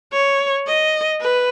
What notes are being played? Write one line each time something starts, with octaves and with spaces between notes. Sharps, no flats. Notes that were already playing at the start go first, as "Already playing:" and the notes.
C#5
D#5
B4